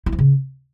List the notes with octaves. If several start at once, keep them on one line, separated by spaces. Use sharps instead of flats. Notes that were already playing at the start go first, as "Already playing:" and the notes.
E4
F3
C#3